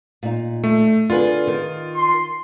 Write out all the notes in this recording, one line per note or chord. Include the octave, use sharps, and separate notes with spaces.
A#2 D#4
A3
D3 F4 G#4 B4
D#3
C6